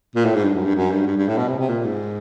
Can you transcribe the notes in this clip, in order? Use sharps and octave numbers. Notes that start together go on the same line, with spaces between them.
A#2
A2
G#2
G2
F#2
G2
F#2
G2
G2
G2
A2
B2
C3
C3
A#2
G#2